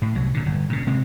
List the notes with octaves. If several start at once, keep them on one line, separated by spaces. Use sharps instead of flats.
A2
C2 F#3
A#2 D3
G1
A#2 C#3
C3 G#3 C4